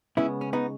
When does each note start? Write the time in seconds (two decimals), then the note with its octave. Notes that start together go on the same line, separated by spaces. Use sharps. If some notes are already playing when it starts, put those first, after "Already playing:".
0.17 C#3 G#3 B3 C#4 E4
0.41 C#4
0.53 B3 D#4